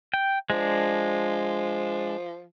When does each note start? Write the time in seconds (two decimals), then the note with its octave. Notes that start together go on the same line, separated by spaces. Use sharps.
0.14 G5
0.50 F3 G#3 D4